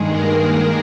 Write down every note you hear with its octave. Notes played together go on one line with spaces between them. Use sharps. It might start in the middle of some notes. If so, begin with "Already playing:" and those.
Already playing: G2 D#3 G#3 G#4
A#3 A#4
G#3